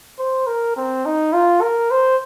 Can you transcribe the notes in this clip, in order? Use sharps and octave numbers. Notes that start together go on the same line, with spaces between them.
C5
A#4
C4
D#4
F4
A#4
C5